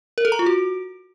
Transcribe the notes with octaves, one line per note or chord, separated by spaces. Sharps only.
A#4
A4
A#5
F4
F#4